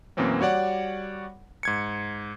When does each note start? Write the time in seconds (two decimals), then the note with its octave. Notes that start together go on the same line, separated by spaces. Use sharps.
0.17 F#2 B2 E3 A#3 C4 C#4
0.40 G3 F#4 C#5 D5 F#5
1.63 G#2 G#6 C#7